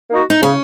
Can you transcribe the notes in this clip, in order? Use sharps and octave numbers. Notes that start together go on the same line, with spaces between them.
A#3 D#4 F#4
D#4
C#3 C#4